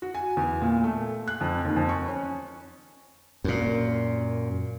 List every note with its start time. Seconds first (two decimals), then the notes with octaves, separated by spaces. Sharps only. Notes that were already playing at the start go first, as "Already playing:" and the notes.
0.02 F#4
0.14 G#5
0.37 E2
0.62 A#2
0.84 A3
1.28 F#6
1.41 F2
1.65 D#2
1.76 F2
1.89 C#6
2.08 C#4
3.44 F#2 A#2